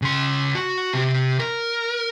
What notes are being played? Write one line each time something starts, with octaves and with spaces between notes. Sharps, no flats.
C#3 C6
F#4
C3 G4
A#4